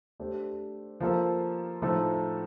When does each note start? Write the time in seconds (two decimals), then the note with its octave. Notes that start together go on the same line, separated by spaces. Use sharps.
0.20 A3 D4 G4 C5
1.00 F3 A#3 F4 A4
1.82 A2 F3 A3 D#4 A4